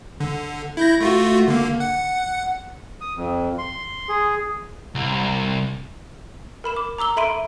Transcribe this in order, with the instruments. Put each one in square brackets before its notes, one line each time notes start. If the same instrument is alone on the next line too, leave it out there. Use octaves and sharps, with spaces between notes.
[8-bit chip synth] D3
E4 G6 A#6
A3 F4 F#4
D3 A#3
F#5
[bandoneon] D#6
F2
C6
G#4
[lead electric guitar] C2
[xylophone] A#4 B5 E7
D6
A#5 D6 E6 G7
A4 E5 B5 C6 D7 D#7